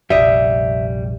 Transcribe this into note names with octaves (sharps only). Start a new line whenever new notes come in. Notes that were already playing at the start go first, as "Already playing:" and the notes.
F1 A#1 G3 D#5 E5